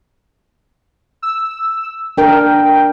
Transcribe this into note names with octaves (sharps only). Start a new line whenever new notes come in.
E6
D4 A#4 G5